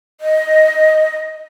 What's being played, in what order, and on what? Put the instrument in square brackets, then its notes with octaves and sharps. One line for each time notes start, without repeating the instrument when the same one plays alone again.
[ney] D#5